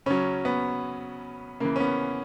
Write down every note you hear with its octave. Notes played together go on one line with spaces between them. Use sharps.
C#3 F#3 C#4
B3
C#3 E3 A#3
C#4
B3